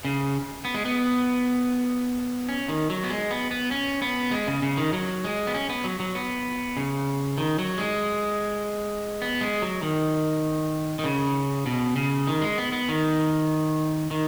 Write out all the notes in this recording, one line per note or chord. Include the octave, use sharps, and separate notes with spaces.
C#3
B3
G#3
B3
C#4
D#3
F#3
B3
G#3
B3
B3
C#4
B3
G#3
C#3
C#3
D#3
F#3
G#3
B3
C#4
B3
F#3
F#3
B3
C#3
D#3
F#3
G#3
B3
G#3
F#3
D#3
D#3
C#3
B2
C#3
D#3
G#3
B3
B3
D#3
D#3